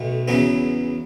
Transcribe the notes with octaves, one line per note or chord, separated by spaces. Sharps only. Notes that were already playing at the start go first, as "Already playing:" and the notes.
Already playing: B1 B2 A3
E2 C#3 F#3 B3